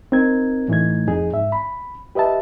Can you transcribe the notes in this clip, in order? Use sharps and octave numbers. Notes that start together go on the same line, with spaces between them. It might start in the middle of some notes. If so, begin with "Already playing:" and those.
C4 D#4 A#4 G#6
A2 E3 A3 D#4 G#6
F2 D#4 G#4
G#2 E5
B5
G4 B4 D#5 E5 A5